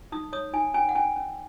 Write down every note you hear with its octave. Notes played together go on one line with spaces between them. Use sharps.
D#4 D#6
C#5 D#6
D#4 G#5
C#4 G#5
F#5
C#4 G#5
C#4